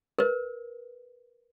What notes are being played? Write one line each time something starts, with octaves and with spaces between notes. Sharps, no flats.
A#4 B4